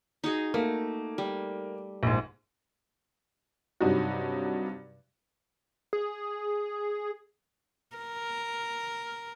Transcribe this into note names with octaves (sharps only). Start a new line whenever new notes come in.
D#4 F#4 G#4
A3 A#3
G3
A#1 G#2
G2 C3 F#3 D#4 F#4
G#4
A#4